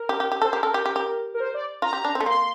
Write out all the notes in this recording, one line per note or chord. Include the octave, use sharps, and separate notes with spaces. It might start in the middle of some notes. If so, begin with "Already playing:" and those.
Already playing: A#4
G4
G4
G4
A4 C5
G4 A#4
A4
G4
G4
G4
A#4
C5
D5
F4 A#5
G4
D4
C4
A3
A#3 C6